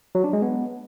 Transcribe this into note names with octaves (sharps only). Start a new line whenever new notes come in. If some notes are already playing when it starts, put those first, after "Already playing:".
F#3
D4
G#3
B3